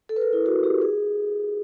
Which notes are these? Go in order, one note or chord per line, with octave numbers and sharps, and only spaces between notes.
A4
B4
A#4
E4
F#4
G4
G#4